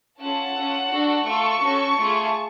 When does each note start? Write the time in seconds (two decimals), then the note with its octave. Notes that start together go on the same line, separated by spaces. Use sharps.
0.20 C#4 F4 A4 F#5 A5
0.55 C#4 F4 A4
0.91 D4 F#4 A4
1.26 A3 F4 A4 A5 C#6
1.61 C#4 F#4 A4
1.97 A3 F4 G#4